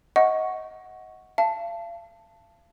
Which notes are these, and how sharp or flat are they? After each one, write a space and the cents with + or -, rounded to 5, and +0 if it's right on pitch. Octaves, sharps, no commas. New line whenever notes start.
D#5 +25 F#5 -5 C#6 +0
F5 -40 A5 +0